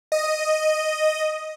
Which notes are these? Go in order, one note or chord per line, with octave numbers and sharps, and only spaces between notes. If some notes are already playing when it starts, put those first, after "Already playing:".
D#5